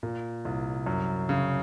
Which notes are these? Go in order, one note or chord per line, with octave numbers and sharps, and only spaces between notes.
A#2
C2
F#2
C#3